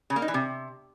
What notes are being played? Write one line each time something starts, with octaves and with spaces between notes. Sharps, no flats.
C#3
A#3
D#4
E3
C3